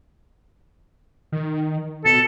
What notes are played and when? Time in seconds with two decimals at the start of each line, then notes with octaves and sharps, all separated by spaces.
1.32 D#3
2.05 B2 A4